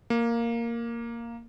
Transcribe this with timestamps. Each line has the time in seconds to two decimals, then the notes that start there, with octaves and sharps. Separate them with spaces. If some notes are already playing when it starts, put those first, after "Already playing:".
0.10 A#3